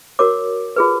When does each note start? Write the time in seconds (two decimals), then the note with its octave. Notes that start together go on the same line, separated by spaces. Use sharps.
0.19 F#4 A#4 C#5 D6
0.76 F4 G#4 B4